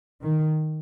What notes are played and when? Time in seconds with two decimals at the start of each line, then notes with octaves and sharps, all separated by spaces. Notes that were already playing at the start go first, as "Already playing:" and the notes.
0.23 D#3